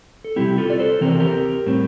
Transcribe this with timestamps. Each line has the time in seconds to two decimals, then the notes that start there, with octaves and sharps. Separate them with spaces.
0.24 A4
0.36 C3 E3 G3 C4 E4 G4
0.58 F4 A4
0.70 D5
0.79 A4 C5
1.01 C3 E3 C4 A#4
1.11 A4
1.20 G4 A#4
1.66 A2 G3 C4